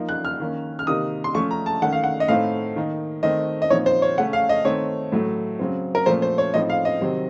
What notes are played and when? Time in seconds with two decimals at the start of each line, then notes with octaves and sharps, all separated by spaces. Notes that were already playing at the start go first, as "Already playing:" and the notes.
Already playing: F3 A#3 D#4
0.09 F#6
0.25 F6
0.40 D#3 A#3 C#4
0.79 F6
0.87 C3 D#3 A#3 D#4 D#6
1.24 C6
1.35 F3 A3 C#4 C#6
1.51 A#5
1.66 A5
1.82 D#3 A3 C#4 F#5
1.93 F5
2.04 F#5
2.20 D#5
2.28 A2 A3 C4 D#4 F5
2.76 D#3 A#3 D#4
3.23 D#3 A3 C4 D#5
3.62 D#5
3.70 A#2 F3 C4 D#4 C#5
3.86 C5
4.02 C#5
4.18 C#3 A3 C#4 F#5
4.33 F5
4.49 D#5
4.65 D#3 A3 C4 D#4 C#5
5.12 A2 F#3 A3
5.59 C#3 F#3 C4
5.95 A#4
6.06 A#2 F3 A3 C#4 C5
6.22 C5
6.38 C#5
6.54 A2 F3 C4 D#4 D#5
6.70 F5
6.85 D#5
7.01 C3 D#3 F#3 C4